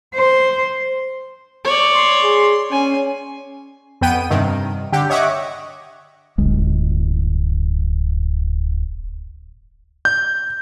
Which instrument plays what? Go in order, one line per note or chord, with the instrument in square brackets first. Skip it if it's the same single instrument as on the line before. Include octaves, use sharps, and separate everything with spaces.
[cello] C5
[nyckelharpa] C#5 D5
[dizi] C6
[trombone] G#4
[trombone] C#4 [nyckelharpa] G#5
[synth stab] F2 B3 G5 D#7
G2 C3 D#3
D3 G4
C#5 D#5 E5 F#5 C#6 D6
[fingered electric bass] D1 G1 G#3
[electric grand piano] G6